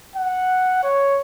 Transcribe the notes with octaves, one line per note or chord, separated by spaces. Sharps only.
F#5
C#5